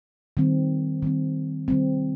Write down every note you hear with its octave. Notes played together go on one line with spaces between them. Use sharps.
D#3 G3 C4
D#3 G3 C4
D#3 G3 C4